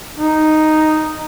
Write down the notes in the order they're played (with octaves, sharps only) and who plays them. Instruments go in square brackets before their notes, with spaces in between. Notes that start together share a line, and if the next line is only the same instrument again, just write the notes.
[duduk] D#4